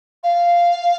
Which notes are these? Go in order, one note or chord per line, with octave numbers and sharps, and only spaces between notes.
F5